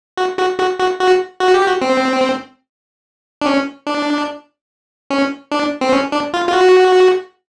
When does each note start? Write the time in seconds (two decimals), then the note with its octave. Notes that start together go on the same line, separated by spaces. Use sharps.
0.17 F#4
0.39 F#4
0.59 F#4
0.79 F#4
1.00 F#4
1.40 F#4
1.54 G4
1.67 F#4
1.82 C4
3.41 D4
3.46 C#4
3.87 D4
5.10 C#4
5.52 D4
5.81 C4
5.93 C#4
6.12 D4
6.34 F4
6.49 F4
6.53 F#4